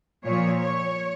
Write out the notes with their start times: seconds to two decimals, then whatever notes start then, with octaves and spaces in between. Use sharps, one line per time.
0.24 A#2 F3 C#5
0.58 C#5